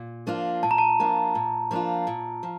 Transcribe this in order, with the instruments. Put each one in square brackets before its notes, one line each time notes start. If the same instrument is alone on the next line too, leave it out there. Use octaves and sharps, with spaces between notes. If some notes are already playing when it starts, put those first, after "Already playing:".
Already playing: [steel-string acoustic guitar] A#2
F3 A#3 D4 F4
[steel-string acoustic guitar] A#2 [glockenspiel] A5
[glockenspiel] A#5
A5
[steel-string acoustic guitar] F3 A#3 D4 F4
A#2
F3 A#3 D4 F4
A#2
F3